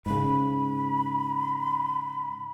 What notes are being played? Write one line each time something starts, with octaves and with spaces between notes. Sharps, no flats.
G#2 C#3 B5